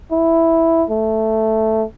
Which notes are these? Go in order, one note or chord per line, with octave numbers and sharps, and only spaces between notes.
E4
A3